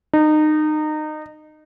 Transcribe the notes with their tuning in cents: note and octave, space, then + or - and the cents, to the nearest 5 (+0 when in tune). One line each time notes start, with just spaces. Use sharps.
D#4 -25